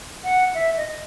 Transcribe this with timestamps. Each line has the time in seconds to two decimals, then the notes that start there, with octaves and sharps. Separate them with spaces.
0.24 F#5
0.54 E5
0.77 D#5